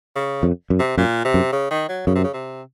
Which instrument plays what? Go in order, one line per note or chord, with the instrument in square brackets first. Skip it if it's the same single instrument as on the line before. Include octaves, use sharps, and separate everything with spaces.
[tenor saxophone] C#3
[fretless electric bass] F2
F#2
[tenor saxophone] C3
[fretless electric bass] F#2 [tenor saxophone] A#2
[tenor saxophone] C3
[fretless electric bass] F#2
[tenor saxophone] C#3
D#3
F#3
[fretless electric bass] F#2 [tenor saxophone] C#3
[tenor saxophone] C3
C#3
C3